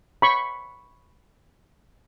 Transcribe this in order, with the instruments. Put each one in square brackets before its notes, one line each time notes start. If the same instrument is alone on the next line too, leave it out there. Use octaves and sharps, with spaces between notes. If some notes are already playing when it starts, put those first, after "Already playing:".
[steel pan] B5 C#6